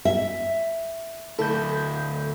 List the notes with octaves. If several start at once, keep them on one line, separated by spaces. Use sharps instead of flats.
E5
D2 E4 A4 G6